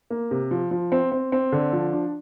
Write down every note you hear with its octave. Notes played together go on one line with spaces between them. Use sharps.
A#3
C3
F3
F3
C4
C4
C4
D3
F3
D4